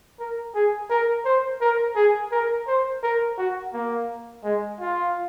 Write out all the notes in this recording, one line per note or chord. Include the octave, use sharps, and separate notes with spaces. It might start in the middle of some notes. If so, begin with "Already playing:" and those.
A#4
G#4
A#4
C5
A#4
G#4
A#4
C5
A#4
F#4
A#3
G#3
F4